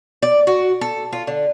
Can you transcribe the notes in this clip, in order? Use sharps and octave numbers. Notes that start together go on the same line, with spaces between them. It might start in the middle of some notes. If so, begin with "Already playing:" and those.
D5
F#4
A4
F4
D3